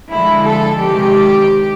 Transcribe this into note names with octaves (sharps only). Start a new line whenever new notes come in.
D3 F3 G#3 E4
A4
C3 D#3 G#3 G4